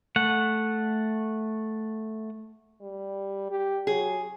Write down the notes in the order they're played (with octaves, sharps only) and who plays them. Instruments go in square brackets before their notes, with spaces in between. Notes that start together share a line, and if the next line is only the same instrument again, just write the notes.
[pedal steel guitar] A3 F#5
[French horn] G3
G4
[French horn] F#3 [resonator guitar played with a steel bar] G#4